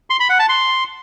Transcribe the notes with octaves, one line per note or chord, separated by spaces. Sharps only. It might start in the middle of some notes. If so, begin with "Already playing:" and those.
C6
B5
F#5
A5
C6